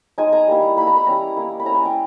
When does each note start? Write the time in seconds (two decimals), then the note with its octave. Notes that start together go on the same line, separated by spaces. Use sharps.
0.18 G#3 D#4 G#5
0.33 A#5
0.47 G3 A#3 E4
0.76 A#3 E4 B5
0.87 A#5
0.97 B5
1.07 G3 C#4 E4 A#5
1.36 A#3 E4
1.60 B5
1.65 A#3 C#4 E4 A#5
1.75 G#5
1.85 G5